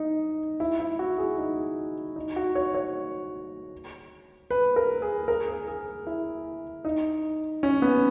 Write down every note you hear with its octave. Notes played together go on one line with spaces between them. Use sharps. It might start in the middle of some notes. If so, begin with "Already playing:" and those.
Already playing: D#4
E4
E4
F#4
G#4
D#4
D#4
F#4
C#5
C#5
B4
A#4
G#4
A#4
G#4
G#4
E4
D#4
C#4
B3